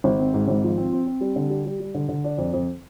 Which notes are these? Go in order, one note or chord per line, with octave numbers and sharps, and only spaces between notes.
G#1
C4
G#2
G#1
F3
C4
C4
C4
G3
D3
G3
G3
G3
D3
D3
D4
F2
F2